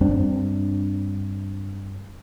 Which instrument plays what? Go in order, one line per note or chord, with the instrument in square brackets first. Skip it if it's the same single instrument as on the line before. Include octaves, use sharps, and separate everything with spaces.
[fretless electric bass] G2 C4 D4